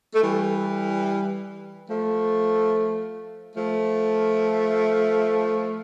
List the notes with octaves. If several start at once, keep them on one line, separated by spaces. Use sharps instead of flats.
A3
E3 G3
F3 A3
F3 A3